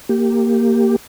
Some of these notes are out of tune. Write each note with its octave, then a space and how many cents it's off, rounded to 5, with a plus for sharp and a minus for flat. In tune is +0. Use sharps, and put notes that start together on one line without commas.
A#3 -10 G4 +0